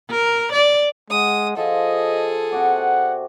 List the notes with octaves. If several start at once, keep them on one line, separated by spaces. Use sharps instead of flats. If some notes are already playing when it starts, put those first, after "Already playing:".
A#4
D5
G#3 F#5 D#6
F3 G#4 A4 D#5
C3 F#4 D5 F#5